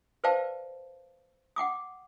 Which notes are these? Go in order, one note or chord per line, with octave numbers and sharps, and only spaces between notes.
B4 C5 D5 F5 G5 A5
F#5 G5 D6 D#6